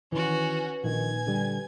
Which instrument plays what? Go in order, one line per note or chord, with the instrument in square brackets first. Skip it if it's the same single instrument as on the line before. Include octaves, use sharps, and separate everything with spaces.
[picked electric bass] D#3 E3 [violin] C#4 F#4 [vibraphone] B4
[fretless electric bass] A#1 D#3 [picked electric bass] A#2 [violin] G#5 G#6
[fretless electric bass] D3 G3